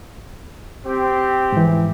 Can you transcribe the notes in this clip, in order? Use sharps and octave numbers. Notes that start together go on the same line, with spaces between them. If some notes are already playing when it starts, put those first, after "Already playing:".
C4 G4
G#2 E3